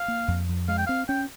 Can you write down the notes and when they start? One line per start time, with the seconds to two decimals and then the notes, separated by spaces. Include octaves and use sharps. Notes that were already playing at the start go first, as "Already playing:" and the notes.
Already playing: F5
0.08 A#3
0.28 F2
0.49 F2
0.68 G#3 F5
0.78 G5
0.87 C4 F5
1.08 C#4 G5